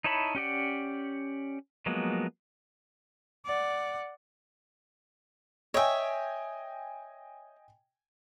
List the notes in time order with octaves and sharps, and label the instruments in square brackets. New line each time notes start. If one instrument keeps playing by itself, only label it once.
[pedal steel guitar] D#4 E4 C#5 A5 B5
C#4 G4 D5 F#5
F3 F#3 G#3 A#3 B3
[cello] D5 F#5
[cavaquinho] C#5 E5 [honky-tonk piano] D#5 G5 G#5